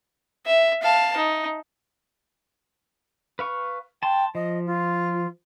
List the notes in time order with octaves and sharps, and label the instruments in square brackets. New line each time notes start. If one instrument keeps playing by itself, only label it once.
[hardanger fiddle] E5
F5 A5
D#4
[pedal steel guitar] B4 F5 C#6
[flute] G5 [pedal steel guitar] A5 C6
[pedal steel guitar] F3 [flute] D#5
[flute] F4